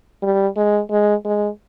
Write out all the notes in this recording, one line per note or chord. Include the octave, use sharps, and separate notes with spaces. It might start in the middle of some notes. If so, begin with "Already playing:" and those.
G3
G#3
G#3
G#3